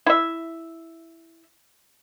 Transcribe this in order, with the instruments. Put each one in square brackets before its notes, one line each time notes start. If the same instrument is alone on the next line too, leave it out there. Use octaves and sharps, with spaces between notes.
[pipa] E4 E5